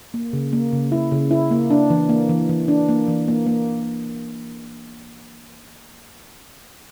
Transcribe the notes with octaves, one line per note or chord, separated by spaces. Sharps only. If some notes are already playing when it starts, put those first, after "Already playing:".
A#3
C#3
A#3
C#3
E4
C#3
E4
A#3
D4
E3
A#3
E3
E3
D4
A#3
E3
A#3
A#3